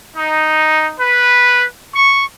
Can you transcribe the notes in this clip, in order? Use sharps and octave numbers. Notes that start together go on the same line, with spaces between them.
D#4
B4
C#6